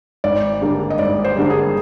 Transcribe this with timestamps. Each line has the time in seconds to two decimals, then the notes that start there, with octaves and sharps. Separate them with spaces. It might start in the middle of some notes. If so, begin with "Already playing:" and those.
0.24 G#1 D5
0.61 G2 D3 G3 A#3
0.90 D#5
0.99 G#1 D5
1.25 C5
1.36 G2 D3 G3 A#3
1.50 G#4